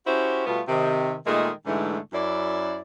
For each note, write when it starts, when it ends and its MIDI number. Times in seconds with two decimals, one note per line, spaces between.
0.06 0.42 61
0.06 0.42 64
0.06 0.42 66
0.06 0.42 67
0.06 0.42 72
0.46 0.61 47
0.46 0.61 55
0.46 0.61 57
0.46 0.61 59
0.46 0.61 65
0.67 1.14 48
0.67 1.14 51
1.25 1.50 46
1.25 1.50 51
1.25 1.50 56
1.25 1.50 57
1.25 1.50 68
1.25 1.50 70
1.67 1.98 44
1.67 1.98 50
1.67 1.98 52
1.67 1.98 56
1.67 1.98 57
2.13 2.80 42
2.13 2.80 64
2.13 2.80 74